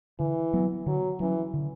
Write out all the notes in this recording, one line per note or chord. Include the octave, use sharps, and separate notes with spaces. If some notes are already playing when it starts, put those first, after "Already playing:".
D3 E3
F#3 B3
D3 F#3
E3 F#3 C#4
D3